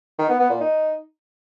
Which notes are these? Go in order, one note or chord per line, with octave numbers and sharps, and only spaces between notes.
D#3
B3
B3
A#2
D#4